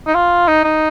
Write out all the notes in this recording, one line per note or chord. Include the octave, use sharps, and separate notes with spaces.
D#4
F4
D#4
D#4